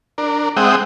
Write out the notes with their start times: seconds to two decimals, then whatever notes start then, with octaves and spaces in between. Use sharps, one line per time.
0.18 D4 A#4
0.57 G#3 C4 E5 F#5 G5 D#6